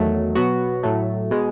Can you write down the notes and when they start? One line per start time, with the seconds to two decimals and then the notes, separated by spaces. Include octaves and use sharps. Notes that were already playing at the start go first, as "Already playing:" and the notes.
Already playing: E2 D#3 F#3 A3
0.35 B2 F#3 B3 F#4
0.83 A2 F#3 A3
1.31 B2 G#3